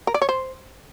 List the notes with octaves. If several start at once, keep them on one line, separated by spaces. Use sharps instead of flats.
A#4
D5
C#5
C5